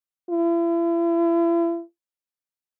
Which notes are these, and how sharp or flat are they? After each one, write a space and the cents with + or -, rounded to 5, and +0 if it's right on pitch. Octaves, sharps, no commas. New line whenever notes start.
E4 +40